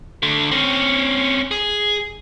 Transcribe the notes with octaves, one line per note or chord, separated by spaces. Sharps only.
D3 A3
C4 C#4
G#4